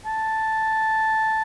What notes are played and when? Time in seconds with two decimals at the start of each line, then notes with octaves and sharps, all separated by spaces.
0.06 A5